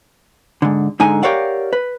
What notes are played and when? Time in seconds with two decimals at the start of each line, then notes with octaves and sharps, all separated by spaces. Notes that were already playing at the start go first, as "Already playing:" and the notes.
0.62 G#2 D3
1.00 G#2 D3 D#4 G#5
1.23 G4 A#4 C#5 D5 F5 F#5
1.73 B4